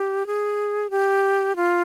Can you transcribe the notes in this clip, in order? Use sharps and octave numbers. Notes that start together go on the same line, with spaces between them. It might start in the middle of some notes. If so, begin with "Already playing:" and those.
Already playing: G4
G#4
G4
F4